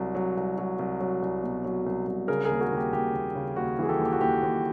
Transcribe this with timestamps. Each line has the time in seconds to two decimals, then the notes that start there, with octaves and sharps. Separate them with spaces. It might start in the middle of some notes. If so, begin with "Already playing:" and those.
Already playing: C2 F#3
0.15 F#3
0.37 C2
0.58 F#3
0.79 C2
1.00 F#3
1.22 C2
1.43 B2
1.64 F#3
1.86 C2
2.07 C2
2.28 C#3 G#4 A#4
2.45 D#2 G#4 A#4
2.60 F#4 G#4
2.72 D#2
2.77 G4
2.93 D#2 G4
3.15 D#2
3.35 C#3
3.56 D#2 F#4
3.79 E3 G#4
3.89 G4 A4
4.00 D#2
4.05 G4
4.12 F#4
4.21 D#2 G4
4.42 D#2